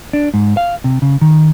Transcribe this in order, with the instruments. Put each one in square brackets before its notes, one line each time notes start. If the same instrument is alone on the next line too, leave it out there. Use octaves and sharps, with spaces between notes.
[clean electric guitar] D4
G#2
F5
C3
C#3
D#3